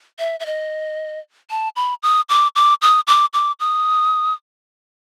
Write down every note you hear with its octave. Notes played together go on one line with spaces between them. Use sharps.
E5
E5
D#5
A5
B5
D#6
D6
D6
D#6
D6
D6
D#6